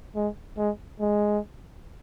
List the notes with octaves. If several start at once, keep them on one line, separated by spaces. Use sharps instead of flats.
G#3
G#3
G#3